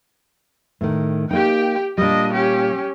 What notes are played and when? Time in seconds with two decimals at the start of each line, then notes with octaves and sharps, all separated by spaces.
0.81 A2 D#3
1.31 A#3 D#4 G4 G5
1.98 A#2 G3 D4 D#5
2.33 C#4 G4